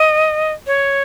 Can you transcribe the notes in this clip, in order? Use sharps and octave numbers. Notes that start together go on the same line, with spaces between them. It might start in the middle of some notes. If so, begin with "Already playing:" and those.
Already playing: D#5
C#5